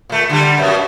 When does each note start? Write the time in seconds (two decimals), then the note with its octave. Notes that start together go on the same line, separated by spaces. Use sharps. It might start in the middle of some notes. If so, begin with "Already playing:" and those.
0.09 A#2 A3
0.29 D3 G3
0.58 F#2 B2